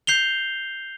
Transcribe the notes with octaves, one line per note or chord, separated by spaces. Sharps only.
G6 C7 F7 G7